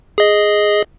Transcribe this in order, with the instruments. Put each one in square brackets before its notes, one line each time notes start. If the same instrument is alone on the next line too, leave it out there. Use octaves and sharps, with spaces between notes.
[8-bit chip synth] G#4 D#5